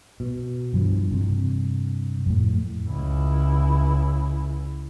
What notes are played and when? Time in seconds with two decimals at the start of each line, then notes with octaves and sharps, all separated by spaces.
0.20 B2
0.73 G2 E3 F3
1.11 G2 C3
2.26 F2 A2
2.88 C#2 E4